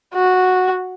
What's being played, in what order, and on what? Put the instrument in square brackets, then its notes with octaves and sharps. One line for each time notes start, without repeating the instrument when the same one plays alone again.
[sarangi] F#4